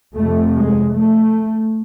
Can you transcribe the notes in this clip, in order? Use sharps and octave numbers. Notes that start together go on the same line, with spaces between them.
F2 C3 A3
G#3
A3